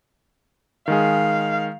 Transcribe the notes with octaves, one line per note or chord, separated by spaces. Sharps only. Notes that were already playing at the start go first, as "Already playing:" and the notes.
D#3 G#3 G#4 F5